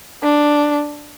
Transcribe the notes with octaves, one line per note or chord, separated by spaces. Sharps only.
D4